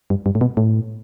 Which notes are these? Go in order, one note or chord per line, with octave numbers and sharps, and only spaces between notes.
G2
G2
A2
B2
A2